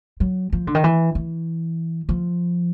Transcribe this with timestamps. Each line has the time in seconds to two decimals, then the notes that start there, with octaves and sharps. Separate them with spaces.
0.20 F#3
0.52 F3
0.67 D3
0.75 D#3
0.84 E3
1.15 E3
2.09 F3